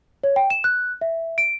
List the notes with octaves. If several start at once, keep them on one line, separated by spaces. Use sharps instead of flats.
C#5
G5
E7
F#6
E5
D7